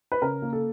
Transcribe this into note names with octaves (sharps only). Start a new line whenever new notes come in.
B4
C#3 A#4
A#3
A4